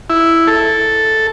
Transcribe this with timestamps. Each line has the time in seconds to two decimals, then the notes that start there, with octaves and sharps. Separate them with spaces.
0.10 E4
0.47 A4